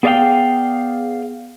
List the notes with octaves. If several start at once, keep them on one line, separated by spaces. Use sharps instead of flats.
B3 G#4 D5 E5 F5 G5